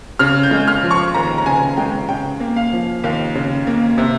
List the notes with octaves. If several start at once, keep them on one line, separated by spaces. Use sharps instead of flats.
C#3 F6
G6
G#3
F6
F3
C#6
D#2 A#5
A#5
C#3 G#5
G#3 G5
C#3 G5
A#3
F5
F3
D#2 F5
C#3
A#3
C3